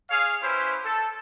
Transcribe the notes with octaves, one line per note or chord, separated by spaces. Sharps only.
G#4 C#5 F5
C#4 E4 G4 B4 C5
A4